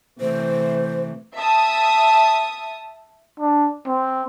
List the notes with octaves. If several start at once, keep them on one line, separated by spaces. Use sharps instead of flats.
C3 E3 A3 C5
E5 A5 D#6
D4
C4